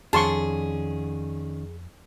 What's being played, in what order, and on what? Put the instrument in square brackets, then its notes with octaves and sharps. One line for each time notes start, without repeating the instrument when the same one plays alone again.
[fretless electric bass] F2 [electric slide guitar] D#3 C#4 [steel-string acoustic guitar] G#4 [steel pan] A5 C6 C#6